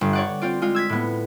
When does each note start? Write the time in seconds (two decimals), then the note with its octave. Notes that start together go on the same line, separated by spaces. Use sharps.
0.01 G1
0.13 C#5 D5 F#5
0.42 C4 F4 D5
0.62 G#3 F4
0.75 E6 G#6 B6
0.89 A2 B3